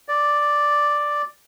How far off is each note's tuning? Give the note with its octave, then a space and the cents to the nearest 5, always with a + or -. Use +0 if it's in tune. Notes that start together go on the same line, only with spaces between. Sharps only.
D5 +0